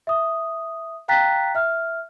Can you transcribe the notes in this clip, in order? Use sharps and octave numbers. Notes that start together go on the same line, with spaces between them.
E5 D#6
F5 G5 A#5 F#6 A6 B6
E5 F6